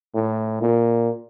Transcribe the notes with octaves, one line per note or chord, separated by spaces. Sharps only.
A2
A#2